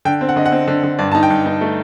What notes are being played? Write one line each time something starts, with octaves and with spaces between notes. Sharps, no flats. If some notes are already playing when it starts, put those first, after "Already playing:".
D3 G5
C4
F#5
D3 D#5
F#5
C4
D3
D3
G2 D5
D#4 A5
G5
G2
D#4
A3